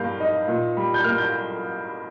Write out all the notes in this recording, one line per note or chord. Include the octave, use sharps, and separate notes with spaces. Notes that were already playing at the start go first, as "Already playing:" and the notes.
Already playing: G2 G3 A#3 F5 G6
D#4
A#2
G3
G6
A#3 F6
G6